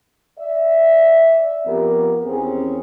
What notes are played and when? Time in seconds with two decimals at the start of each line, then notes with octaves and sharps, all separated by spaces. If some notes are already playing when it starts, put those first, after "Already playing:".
0.39 D5 E5
1.66 F2 B3 G4 A#4
2.26 E2 C4 C#4 G#4